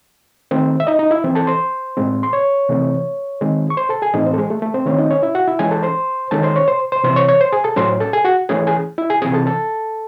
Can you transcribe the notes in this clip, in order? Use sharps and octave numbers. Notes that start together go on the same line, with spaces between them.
D#3 A3 C4
E5
D#4 D#5
D#4 D#5
E4 E5
E3 C4
A4 A5
C5 C6
A2 G#3 C4
C6
C#5 C#6
C3 E3 A3 C4
D#3 G#3 C4
C#6
C5 C6
A4 A5
G#4 G#5
A2 E3 A3 C4 D#4 D#5
C4 C5
A4
G#3 G#4
A3 A4
A3 A4
C4 C5
D#3 A3 C4 C#4 C#5
D#4 D#5
C#4 C#5
E4 E5
F#4 F#5
E4 E5
E3 G#3 C#4 G#4 G#5
A4 A5
C5 C6
D#3 G#3 C#4 A4 A5
C5 C6
C#5 C#6
C5 C6
C5 C6
C3 E3 C4 C5 C6
C#5 C#6
C#5 C#6
C5 C6
G#4 G#5
A4 A5
A2 F#3 C#4 C5 C6
A4 A5
G#4 G#5
F#4 F#5
E3 A3 C#4 G#4 G#5
G#4 G#5
E4 E5
G#4 G#5
C3 E3 C4 G#4 G#5
A4 A5
A4 A5